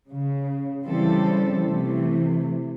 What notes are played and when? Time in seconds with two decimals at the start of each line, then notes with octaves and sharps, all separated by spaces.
0.11 C#3
0.86 C#3 E3 G3 C4 A4
1.65 C3 E3 A3